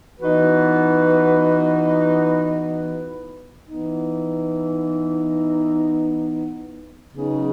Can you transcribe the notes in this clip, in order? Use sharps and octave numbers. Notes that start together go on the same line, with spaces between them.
E3 B3 D#4 F#4 B4
E3 B3 D#4
C#3 F#3 B3 D#4 G#4